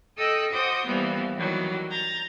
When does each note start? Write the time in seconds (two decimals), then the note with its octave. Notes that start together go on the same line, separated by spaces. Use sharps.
0.17 A4 D#5 G5 D#6 E6 F#6
0.53 F#4 C5 D#5 D6 D#6 G6
0.85 E3 F3 G3 A#3 B3
1.37 D#3 E3 F#3 G3
1.90 A#5 G6 A6